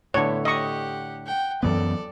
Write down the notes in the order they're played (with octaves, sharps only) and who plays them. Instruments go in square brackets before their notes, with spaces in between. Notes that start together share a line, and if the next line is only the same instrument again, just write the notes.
[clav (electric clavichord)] A2 D3 [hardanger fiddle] B3 [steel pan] C#5
[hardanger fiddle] G4 F#5 [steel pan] D#5 C#6
[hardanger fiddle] F#5 G5
[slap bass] F#2 E3 B3 [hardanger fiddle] A4 D5